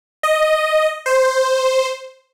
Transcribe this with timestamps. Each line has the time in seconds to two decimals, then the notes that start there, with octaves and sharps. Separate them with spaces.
0.23 D#5
1.06 C5